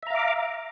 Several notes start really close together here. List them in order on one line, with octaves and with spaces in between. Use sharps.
E5 A#5 F5 D6